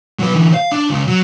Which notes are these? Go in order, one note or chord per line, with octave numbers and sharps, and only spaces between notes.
F#3 B4
D3 E3
F5
D4
C#2 C#3
F#3